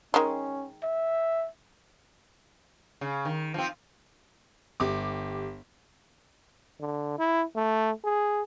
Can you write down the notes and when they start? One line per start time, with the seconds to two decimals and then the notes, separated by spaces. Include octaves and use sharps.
0.14 D#3 G#3 C#4
0.83 E5
3.01 C#3
3.25 D#3
3.54 F3 C4
4.80 G1 G4 D6
6.80 D3
7.18 E4
7.55 A3
8.04 G#4